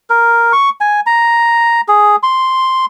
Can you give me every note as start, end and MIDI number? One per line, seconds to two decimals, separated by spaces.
0.10 0.52 70
0.53 0.70 85
0.81 1.00 80
1.06 1.81 82
1.88 2.16 68
2.23 2.85 84